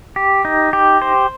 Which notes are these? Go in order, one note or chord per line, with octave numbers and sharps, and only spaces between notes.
G4
D#4
G4
C5